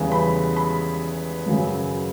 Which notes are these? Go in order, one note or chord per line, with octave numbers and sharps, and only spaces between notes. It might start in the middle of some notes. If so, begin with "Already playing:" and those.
Already playing: E2 C#3 E3 G3
B5
B5
F#2 C#3 F#3